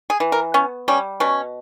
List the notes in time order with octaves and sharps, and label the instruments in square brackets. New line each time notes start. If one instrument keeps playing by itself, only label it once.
[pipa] G#4
E3
A#4
B3 C#4
G3 C#4
B2 C#4